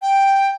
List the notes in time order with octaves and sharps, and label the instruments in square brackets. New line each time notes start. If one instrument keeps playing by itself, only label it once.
[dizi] G5